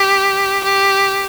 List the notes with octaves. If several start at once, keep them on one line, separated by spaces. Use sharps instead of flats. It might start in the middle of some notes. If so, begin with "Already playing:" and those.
Already playing: G4
G4